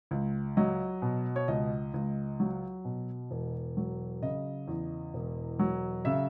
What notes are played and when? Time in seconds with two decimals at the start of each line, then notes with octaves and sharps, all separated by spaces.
0.11 C#2
0.57 F#3 D#5
1.02 B2
1.36 C#5
1.48 C#2 D#5
1.94 C#2
2.40 F#3
2.85 B2
3.31 E1
3.77 F#3
4.23 C#3 D#5
4.68 E2
5.14 E1
5.59 F#3
6.05 C#3 E5